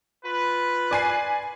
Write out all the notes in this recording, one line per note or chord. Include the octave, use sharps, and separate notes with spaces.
F4 B4
D5 G#5 C7